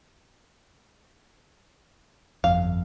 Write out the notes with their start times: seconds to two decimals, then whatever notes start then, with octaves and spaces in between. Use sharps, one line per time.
2.44 G1 F2 F5